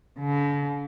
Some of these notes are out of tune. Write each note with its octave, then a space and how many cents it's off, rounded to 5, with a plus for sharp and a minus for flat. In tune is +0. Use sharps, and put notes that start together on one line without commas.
D3 -45